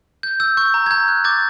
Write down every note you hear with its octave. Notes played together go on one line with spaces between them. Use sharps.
G6
E6 G6
C#6 G6
A#5
G#6
A#5 G6
F#6
D6 G6 A6